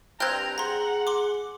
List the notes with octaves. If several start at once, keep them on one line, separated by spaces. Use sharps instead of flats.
G2 C4 G5 A#5 F6 F#6 G#6
G#4 F#5 A#5 C6
C6 D6